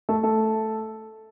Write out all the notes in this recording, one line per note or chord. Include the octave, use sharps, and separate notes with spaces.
A3 A4
A3 A4